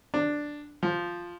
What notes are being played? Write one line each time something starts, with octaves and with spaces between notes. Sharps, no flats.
D4
F3